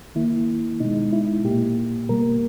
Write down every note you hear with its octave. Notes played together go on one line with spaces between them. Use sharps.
D#3 A#3 E4
B2 G#3 D#4
E4
A#2 A#3 G4
B2 G3 A#3 A#4